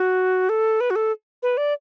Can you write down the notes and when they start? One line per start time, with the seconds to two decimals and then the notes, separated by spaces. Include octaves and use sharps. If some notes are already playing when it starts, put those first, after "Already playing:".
Already playing: F#4
0.49 A4
0.80 B4
0.90 F#4
0.96 A4
1.43 B4
1.57 D5